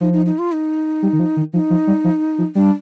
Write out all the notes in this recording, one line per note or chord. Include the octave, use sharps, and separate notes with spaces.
F3 D#4
D#4
D#4
F4
D#4
G3
D#3
F3
D#3
F3 D#4
F3
G3
F3
F3
G3 D4